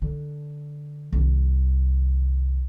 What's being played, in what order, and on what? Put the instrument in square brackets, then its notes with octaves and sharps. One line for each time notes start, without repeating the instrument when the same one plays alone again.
[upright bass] D3
C2 D#3